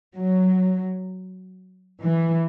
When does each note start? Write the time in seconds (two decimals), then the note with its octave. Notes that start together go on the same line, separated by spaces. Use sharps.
0.16 F#3
2.03 E3